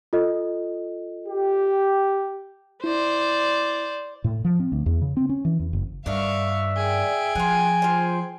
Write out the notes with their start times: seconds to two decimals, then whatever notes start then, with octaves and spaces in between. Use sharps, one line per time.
0.13 F4 A4 D#5
1.27 G4
2.84 E4 C5 D5
4.24 A2
4.44 F3
4.60 C4
4.72 D2
4.86 E2
5.02 C#3
5.17 C4
5.29 C#4
5.45 E3
5.60 E2
5.73 F#1
6.06 G2 D#3 D4 E5 F5 C#6
6.76 G#4 G5
7.35 F3 F4 F#5 G#5
7.82 F4 C5